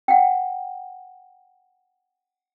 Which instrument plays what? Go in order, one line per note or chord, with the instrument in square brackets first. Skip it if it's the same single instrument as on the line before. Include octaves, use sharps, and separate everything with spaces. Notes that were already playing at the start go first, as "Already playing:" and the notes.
[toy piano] F#5 G5